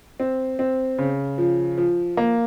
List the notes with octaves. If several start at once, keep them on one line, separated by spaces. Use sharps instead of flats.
C4
C4
C#3
F3
F3
A#3